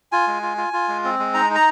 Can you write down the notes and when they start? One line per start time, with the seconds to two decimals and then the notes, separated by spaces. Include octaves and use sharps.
0.12 F4 G#5
0.27 G#3
0.43 F4
0.58 F4
0.73 F4
0.88 G#3
1.05 C4
1.19 G#3
1.34 D#4 A#5
1.50 D#4
1.55 A#5